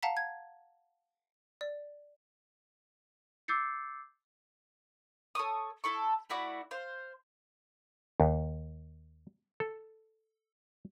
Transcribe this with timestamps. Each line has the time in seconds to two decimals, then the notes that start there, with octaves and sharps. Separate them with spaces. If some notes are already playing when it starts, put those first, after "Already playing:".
0.03 F5 F#5 A5 A#5 B6
0.17 G#6
1.61 D5
3.48 D6 E6 G6 A6 C7 C#7
5.35 A4 C#5 C#6 D#6
5.84 E4 A4 C#6
6.30 A3 E4 F#4 D5
6.71 C5 F5
8.20 D#2
9.60 A4